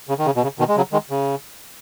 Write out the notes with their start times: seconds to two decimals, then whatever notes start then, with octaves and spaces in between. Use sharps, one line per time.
0.09 C#3
0.19 D#3
0.26 C#3
0.36 B2
0.43 C#3
0.59 B2 D#3
0.68 G#3
0.76 C#3 F#3
0.92 D#3 G#3
1.10 C#3